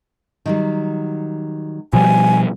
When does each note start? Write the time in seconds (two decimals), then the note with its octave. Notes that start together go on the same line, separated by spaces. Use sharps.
0.46 D#3 F#3 G3
1.93 B2 F3 G3 G#5